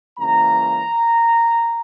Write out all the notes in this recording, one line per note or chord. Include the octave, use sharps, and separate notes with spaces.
C#2 C#3 E3 A#3 A#5